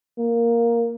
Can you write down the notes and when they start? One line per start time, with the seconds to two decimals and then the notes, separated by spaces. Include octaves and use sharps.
0.19 A#3